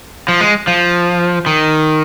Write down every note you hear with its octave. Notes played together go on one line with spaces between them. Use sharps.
F3
G#3
F3
D#3